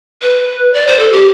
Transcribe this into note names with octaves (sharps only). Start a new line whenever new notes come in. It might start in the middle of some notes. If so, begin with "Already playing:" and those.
B4
D5
C5
A4
G4